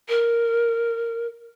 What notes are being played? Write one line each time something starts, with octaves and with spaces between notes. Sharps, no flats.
A#4